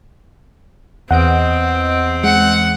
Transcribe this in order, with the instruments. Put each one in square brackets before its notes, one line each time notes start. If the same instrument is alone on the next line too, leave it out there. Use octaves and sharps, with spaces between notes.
[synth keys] E2 D#5 D7 [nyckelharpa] C4 [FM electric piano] F#5
[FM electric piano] G#3 C#7 [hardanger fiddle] F#5